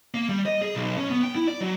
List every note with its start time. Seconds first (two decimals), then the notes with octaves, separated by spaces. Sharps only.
0.14 A#3
0.29 G3
0.46 D#5
0.62 G#4
0.75 B1
0.97 C#4
1.10 B3
1.23 G5
1.35 E4
1.48 D5
1.61 F#3